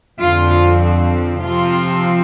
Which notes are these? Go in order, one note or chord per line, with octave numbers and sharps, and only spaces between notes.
F2 D3 F3 C4 F4
C3 F3 C4 F4